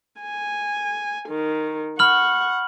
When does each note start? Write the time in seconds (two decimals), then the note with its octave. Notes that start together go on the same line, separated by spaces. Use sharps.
0.21 G#5
1.29 D#3
1.99 F#5 B5 C#6 F6 F#7